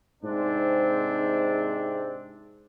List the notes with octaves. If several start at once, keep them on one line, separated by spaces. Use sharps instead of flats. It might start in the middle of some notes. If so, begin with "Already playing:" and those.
G#2 C3 G#3 C4 D4